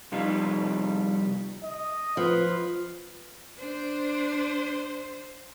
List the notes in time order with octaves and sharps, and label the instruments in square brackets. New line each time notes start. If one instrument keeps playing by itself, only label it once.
[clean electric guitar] C2 F2 G3 D#4 F4
[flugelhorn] D#5
[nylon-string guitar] F3 [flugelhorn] B4
[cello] D4 C5